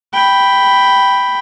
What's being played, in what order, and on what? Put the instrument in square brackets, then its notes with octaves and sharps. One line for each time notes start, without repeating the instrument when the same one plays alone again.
[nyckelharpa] G5 B5